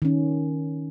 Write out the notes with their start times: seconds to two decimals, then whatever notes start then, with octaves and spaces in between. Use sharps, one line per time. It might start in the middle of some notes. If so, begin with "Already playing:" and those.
0.02 D#3 C#4